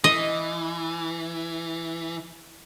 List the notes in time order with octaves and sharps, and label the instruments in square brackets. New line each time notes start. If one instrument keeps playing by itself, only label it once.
[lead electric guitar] E3 [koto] D#5